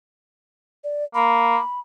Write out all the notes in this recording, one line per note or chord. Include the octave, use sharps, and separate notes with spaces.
D5
A#3 B5